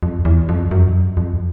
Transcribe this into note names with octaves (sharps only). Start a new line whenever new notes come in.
F2
E2
F2
F#2
F2